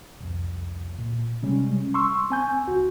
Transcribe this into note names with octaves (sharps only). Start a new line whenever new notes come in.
C2 F2
A#2
C3 G3 G#3 C#4
C6 C#6 E6
C4 G#5 G6
D2 F#4